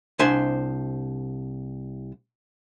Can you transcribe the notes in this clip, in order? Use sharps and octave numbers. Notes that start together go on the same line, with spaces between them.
C2 D4 C5 E5 G#5